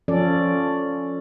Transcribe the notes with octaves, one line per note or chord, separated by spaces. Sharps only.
F3 C#4 A4 D5